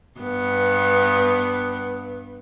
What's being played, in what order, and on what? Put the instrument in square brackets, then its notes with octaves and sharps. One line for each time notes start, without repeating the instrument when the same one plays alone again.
[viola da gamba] G2 B3